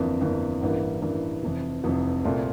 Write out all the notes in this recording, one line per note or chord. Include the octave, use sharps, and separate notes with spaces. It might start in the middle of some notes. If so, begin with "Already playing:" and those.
Already playing: G1 F2 E3 A#3
G1 F2 E3 A#3
A1 G2 E3 A#3
A1 G2 E3 A#3
F1 F2 E3
F1 F2 E3
C2 A#2 A3 C4